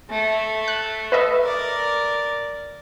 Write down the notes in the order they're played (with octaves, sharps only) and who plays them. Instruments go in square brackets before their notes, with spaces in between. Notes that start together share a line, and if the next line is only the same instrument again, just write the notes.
[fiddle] A3
[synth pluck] F#6
B4 D#5 E5
[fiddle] A#4 D5